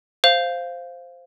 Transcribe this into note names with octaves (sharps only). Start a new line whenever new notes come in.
C5 F5 F7